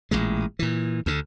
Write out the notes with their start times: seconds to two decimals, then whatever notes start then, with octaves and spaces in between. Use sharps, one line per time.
0.11 A1 A#2 G#3
0.59 A#2 E3
1.06 D2 D3